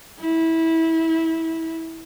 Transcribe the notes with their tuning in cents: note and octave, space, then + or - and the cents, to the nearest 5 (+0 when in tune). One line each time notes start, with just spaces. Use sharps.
E4 -20